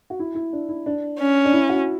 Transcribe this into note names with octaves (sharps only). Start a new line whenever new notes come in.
F#4
E4
E4
D4
E4
D4
C#4
D4
E4
F#4